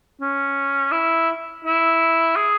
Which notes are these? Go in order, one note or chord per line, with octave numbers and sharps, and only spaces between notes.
C#4
E4
E4
G#4